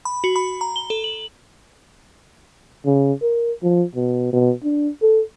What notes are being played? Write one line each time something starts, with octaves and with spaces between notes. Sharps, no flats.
B5
F#4
B5
A#5
G7
A4
F#7
C#3
A#4
F3
B2
B2
D4
A4